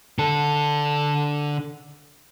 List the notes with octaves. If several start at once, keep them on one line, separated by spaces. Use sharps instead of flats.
D3 A4